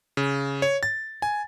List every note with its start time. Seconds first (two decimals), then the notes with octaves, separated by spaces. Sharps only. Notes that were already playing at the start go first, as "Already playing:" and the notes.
0.17 C#3
0.62 C#5
0.83 A6
1.22 G#5